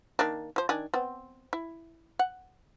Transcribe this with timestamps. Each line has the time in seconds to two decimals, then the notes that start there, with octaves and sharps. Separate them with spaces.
0.19 D#3 A#3 D4
0.56 F3 C5
0.69 D#3 D4 G#5
0.94 B3 C4
1.53 E4
2.19 F#5